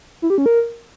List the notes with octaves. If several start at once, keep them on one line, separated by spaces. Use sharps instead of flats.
E4
G4
C#4
A#4